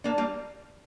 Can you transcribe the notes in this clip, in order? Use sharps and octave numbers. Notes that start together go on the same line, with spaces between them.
A#3 D4
G3 A#3